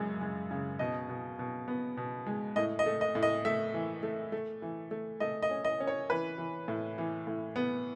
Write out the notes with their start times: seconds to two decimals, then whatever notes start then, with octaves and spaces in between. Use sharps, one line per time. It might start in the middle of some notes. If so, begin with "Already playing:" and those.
Already playing: F#2 C#3 G#3
0.21 G#3
0.51 C#3
0.79 B2 D#5
1.09 B2
1.39 B2
1.68 B3
1.97 B2
2.26 G#3
2.56 A2 D#5
2.79 D#5
2.86 A3
3.01 D#5
3.15 A2
3.23 D#5
3.45 A3 E5
3.74 E3
4.03 A3
4.32 A3
4.62 E3
4.91 A3
5.20 A3 D#5
5.42 D#5
5.51 C#4
5.65 D#5
5.80 C#4
5.87 C#5
6.10 E3 B4
6.38 E3
6.68 A2
6.98 E3
7.27 A2
7.56 B3